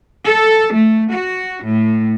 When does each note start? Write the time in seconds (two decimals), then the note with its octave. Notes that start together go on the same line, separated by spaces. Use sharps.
0.25 A4
0.72 A3
1.12 F#4
1.65 A2